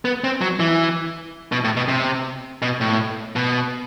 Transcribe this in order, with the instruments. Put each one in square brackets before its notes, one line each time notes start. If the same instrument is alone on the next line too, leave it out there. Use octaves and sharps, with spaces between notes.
[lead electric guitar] B3
C4
F#3
E3
B2
A2
B2
C3
B2
A2
B2